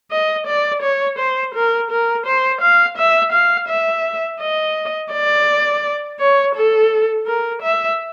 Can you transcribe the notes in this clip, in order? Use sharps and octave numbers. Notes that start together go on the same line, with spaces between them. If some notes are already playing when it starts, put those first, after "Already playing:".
D#5
D5
C#5
C5
A#4
A#4
C5
F5
E5
F5
E5
D#5
D5
C#5
A4
A#4
E5